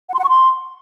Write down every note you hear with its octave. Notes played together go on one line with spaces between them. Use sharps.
F#5
C6
F#5
C#6
C6